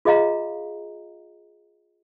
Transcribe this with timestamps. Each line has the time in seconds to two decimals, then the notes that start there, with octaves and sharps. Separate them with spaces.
0.05 F4 G#4 D#5 F5 A#5